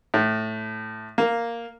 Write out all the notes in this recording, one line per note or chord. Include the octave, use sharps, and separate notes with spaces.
A2
A#3